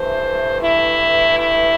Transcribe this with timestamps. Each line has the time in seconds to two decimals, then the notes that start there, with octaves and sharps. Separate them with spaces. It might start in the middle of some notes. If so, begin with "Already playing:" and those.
Already playing: G2 E3 A3 C5
0.60 E4
1.36 E4